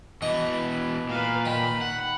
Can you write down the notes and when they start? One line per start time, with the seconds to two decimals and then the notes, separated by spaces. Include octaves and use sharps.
0.22 B2 E3 B4 D#5 C#6
1.09 A#2 B4 F5
1.45 D#3 B5
1.81 F#5